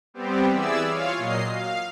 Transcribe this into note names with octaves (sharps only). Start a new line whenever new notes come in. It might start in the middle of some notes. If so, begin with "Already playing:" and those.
G3 B3 C4 G4
E3 E4 G#4 D5 E6
F4 C#5 F5
A#2 F#3 D#5 C7
F5